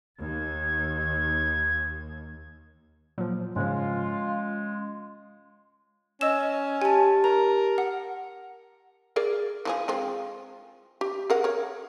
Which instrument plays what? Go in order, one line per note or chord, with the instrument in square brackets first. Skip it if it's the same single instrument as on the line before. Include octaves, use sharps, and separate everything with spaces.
[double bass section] D#2 [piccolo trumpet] G#6
[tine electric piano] A#2 F3 [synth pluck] F#3
[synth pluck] G#2 C#3 F3 [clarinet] G#3 [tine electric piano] C#4 [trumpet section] F4
[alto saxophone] C#4 [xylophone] D#5 E6 E7
[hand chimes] G4 A5 [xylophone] G#5
[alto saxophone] A#4 [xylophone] A#5
[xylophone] F#5
[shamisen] G#4 A#4 D5
E3 F3 G#4
G#3 C4 F4
G4
G#4 A#4 F#5
A#4 C#5